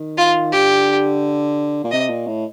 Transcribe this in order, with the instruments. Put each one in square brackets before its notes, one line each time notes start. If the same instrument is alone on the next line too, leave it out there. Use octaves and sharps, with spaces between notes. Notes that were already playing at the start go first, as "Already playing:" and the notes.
Already playing: [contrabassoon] D#3
[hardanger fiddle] F4
[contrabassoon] D3 [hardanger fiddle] G4
[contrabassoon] A#2
[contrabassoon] C3 [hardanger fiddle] D#5
[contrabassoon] A#2
A2